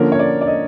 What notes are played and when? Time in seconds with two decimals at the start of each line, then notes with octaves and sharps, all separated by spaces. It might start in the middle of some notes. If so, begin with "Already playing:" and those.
Already playing: D3 F3 A#3 C#4 A#4
0.12 C#5
0.19 D5
0.41 D5
0.47 D#5